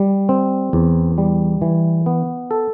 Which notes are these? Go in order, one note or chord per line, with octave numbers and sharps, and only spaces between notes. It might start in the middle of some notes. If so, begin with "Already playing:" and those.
Already playing: G3
C4
E2
G3
E3
B3
A4